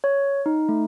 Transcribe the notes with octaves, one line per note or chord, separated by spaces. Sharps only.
C#5
D#4
A3